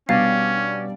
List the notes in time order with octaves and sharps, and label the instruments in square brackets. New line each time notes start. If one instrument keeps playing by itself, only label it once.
[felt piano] B2 B3 A6 [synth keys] G3 D4 D5 [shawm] C#4 [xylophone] F5